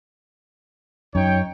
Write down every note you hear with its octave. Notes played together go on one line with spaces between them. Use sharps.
F#2 D#4 C#5 G5